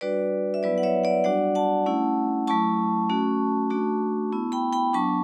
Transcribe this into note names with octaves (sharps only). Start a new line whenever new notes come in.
G3 D4 F#4 B4 D5
E5
F#3 B3 E4 B4 D5
F#5
C#5 E5
D5 F#5
G3 D4 F#4 D5 F#5
F#5 A5
A3 C#4 E4
F#3 A3 E4 A5 C#6
A3 C#4 F#4
A3 D4 F#4
B3 E4
G5 B5
G5 B5
F#3 B3 D4 A5 C#6